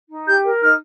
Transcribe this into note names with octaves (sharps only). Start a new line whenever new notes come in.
D#4
G4 G6
A#4
D#4 F6